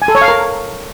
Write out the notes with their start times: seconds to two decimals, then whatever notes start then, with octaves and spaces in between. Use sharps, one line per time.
0.02 G#5
0.08 A4
0.15 C#5
0.21 F5
0.28 A#4